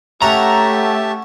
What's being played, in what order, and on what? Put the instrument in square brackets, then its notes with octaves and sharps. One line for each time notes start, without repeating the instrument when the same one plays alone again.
[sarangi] A3 [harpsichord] C#4 F#4 C#5 [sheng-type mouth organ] G4 E5 A5 [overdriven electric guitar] A#5